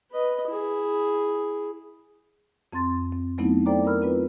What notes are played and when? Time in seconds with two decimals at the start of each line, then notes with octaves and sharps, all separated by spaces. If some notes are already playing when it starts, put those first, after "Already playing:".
0.11 B4 D#5
0.49 E4 G#4
2.73 F2 C4 C6 A6
3.12 C4
3.38 F#3 A3 B3 C4 D#4 E4
3.66 A4 C5 D5 G5 A#5 D6
3.85 A#4 A#5 B5 E6 F6
4.02 C4 F4 B4